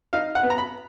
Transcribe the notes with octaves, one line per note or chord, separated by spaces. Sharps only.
D#4 F5
F#5
B3
A#5
B5